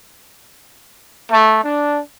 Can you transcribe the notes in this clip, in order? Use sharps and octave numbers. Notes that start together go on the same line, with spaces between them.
A3
D4